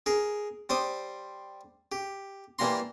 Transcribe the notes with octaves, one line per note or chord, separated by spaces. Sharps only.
G#4 A#4
G3 C5 D6 D#6
G4
E3 G3 A#3 A#5 C6